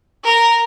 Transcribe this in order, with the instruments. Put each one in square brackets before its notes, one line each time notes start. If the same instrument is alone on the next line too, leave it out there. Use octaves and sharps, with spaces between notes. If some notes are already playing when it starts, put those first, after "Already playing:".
[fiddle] A#4